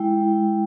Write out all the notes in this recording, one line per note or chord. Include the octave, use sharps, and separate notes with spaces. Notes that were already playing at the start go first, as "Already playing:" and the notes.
Already playing: G#3 E4 G5